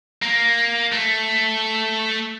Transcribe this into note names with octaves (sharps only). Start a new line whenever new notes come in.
A#3
A3